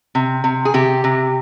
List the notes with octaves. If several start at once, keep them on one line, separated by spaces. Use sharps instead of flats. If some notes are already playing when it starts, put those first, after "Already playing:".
C3
C3
G#4
C3 G4
C3